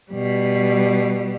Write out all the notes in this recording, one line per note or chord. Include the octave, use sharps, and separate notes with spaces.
B2 G3